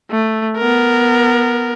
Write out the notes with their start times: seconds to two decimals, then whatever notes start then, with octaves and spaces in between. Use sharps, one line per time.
0.11 A3
0.58 B3 A#4